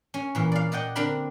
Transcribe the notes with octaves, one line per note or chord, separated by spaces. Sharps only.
C#4
A#2 E3
D5 F5
D5 D#5 F#5 G5
D3 C4 D4 A#4 A#5 B5